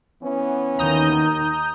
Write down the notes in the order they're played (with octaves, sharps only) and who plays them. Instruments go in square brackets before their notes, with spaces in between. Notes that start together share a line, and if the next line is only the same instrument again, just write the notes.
[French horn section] E3 B3 C#4
[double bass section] D#2 D#3 [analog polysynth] A#5 D#6 G6